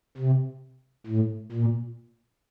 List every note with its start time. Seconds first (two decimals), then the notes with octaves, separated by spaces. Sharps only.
0.18 C3
1.07 A2
1.52 A#2